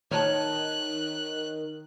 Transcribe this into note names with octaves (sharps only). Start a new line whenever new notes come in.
D#3 C#5 A5 F#6